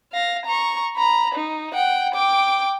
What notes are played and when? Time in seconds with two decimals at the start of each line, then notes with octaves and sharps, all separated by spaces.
0.13 F5 A#6
0.46 A#5 C#6
0.96 A#5 B5
1.35 D#4
1.74 F#5 G5
2.14 G5 D6